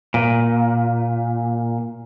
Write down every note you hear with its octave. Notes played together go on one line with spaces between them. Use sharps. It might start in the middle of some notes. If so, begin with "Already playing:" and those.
A#2